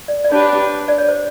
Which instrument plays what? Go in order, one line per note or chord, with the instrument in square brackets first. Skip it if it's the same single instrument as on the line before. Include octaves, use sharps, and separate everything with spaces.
[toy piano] D5
D5
[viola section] D4 G4 B4 [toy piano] C#5
[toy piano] D5
C#5
C5